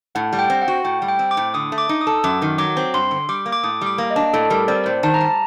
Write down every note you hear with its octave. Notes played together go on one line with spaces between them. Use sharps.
A2 F#5
G3
G5
C4
F#5
F#4
A2 G5
G3
G5
C4
D6
A2
D3 D#6
A3
D6
D#4
D#6
A4
F#2 D6
D#3
F#3 D6
C4
G2 C6
D3
G3 D6
A#3
D6
A2 D#6
G3 D6
A#3
D#5
D4
A2 A4
G3 A#4
C4 D5
A2 C5
D#3 A5
A#5
G3 A5